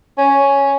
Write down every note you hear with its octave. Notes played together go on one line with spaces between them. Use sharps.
C#4